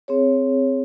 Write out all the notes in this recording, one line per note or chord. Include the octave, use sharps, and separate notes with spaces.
C4 G#4 C#5